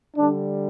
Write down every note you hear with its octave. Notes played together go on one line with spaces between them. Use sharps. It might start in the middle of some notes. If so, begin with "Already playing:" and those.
D3 G3 D4